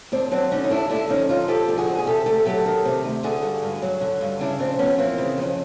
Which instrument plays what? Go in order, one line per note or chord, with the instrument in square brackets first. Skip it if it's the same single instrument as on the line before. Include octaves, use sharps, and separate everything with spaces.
[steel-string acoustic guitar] D#2 C4 D4
F#3 C4 D4
D3 C#4 D#4
D#4
D#2 D4 E4
D3 D4 E4
F2 C#4 D#4
F2 D#4 F4
F3 G4 A4
D3
F#4 G#4
F2
G#4
C3 G4 A4
D2 G4 A4
F#3 G4 A4
D#3
C3
D2
D3 F#4 G#4
G2
G2
F#3
D3
G2
C#3 D4 E4
F2 C4 D4
F2 B3 C#4
E3 A#3 C4
C#3
F2